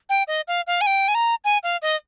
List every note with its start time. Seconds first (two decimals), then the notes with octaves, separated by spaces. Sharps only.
0.09 G5
0.28 D#5
0.48 F5
0.67 F5
0.81 G#5
0.86 G5
1.08 G#5
1.15 A#5
1.44 G#5
1.63 F5
1.82 D#5